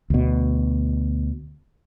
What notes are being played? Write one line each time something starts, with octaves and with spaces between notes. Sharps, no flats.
D2 B2